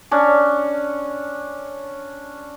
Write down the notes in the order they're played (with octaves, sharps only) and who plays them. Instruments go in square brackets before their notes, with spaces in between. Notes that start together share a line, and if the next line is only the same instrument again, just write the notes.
[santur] C#4 D4